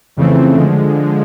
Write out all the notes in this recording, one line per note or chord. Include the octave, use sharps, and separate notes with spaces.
F2 C#3 E3 A3 C4
D3 F3 G#3